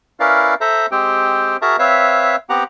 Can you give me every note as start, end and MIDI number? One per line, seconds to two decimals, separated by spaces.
0.20 0.54 61
0.20 0.54 64
0.20 0.54 70
0.20 0.54 71
0.20 0.54 74
0.20 0.54 77
0.61 0.86 69
0.61 0.86 72
0.61 0.86 76
0.61 0.86 82
0.91 1.57 56
0.91 1.57 60
0.91 1.57 67
0.91 1.57 72
0.91 1.57 79
1.62 1.76 66
1.62 1.76 68
1.62 1.76 70
1.62 1.76 76
1.62 1.76 81
1.62 1.76 82
1.79 2.36 60
1.79 2.36 71
1.79 2.36 73
1.79 2.36 76
1.79 2.36 77
2.50 2.64 59
2.50 2.64 60
2.50 2.64 67
2.50 2.64 78
2.50 2.64 82